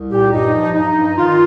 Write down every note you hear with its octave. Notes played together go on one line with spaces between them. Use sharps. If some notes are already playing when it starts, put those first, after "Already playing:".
Already playing: C2
A#2 G4
G2 D#4
F3
G2 D#4
G2
D#3 F4